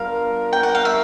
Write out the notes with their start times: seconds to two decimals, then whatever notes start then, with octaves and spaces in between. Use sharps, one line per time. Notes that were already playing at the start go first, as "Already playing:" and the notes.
Already playing: G3 B3 D4 F4 A#4 F5
0.53 G5
0.63 F#5
0.75 F5
0.85 E5